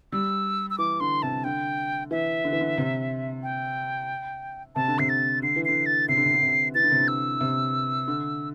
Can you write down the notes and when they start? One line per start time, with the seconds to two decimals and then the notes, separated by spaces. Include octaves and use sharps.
0.12 G3 E6
0.70 E6
0.78 E3 D6
1.00 D3 C6
1.22 C3 A5
1.44 D3 G5
2.11 E3 E5
2.45 D3
2.53 E3
2.61 D3
2.78 C3
3.43 G5
4.75 C3 A5
4.88 D3
4.99 C3 C7
5.09 A6
5.43 D3 C7
5.56 E3
5.65 D3 C7
5.86 A6
6.08 C3 C7
6.17 D3
6.25 C3
6.34 D3
6.42 C3
6.75 E3 A6
6.83 D3
6.92 C3
7.00 D3
7.08 E6
7.41 C3
8.08 D3